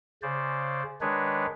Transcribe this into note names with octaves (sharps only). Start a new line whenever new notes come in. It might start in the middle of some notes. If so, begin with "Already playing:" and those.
C#3 C5 D5
D#3 G#3 D4 B4 C#5